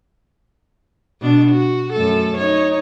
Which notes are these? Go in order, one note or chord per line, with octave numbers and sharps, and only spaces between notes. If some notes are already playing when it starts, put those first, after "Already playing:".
B2 D4
F#4
F#2 A3 A4
D#4 C#5